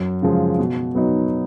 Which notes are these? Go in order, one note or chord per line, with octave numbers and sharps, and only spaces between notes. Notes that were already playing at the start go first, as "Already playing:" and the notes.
Already playing: F#2
C#3 F3 G#3
B2
F#3 B3 D#4